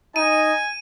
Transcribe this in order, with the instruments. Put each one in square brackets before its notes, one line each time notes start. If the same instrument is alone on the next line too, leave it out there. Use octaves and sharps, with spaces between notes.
[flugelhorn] D#4 [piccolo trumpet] G#5 [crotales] D#7